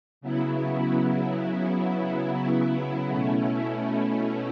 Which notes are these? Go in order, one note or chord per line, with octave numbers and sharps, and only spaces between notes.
C#3 F#3 B3 E4
B2 A3 C#4 E4